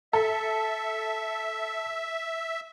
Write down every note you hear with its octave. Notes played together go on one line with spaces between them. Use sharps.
A4 E5